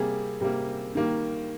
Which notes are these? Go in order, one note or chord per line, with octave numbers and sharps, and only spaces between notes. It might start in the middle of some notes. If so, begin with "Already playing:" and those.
Already playing: C3 G3 A#3 G#4
C3 G3 A#3
D#3 G3 A#3